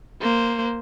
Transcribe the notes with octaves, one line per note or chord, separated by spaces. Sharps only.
A#3 C5